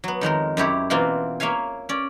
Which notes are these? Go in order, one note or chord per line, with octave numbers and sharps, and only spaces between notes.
F#3 B3
F2 D#3 G#3 A#4
F#2 E4 G4 C#5
B2 E3 A#3 C4 F4
A#3 C#5 E5 F5 G#5
C#4 D5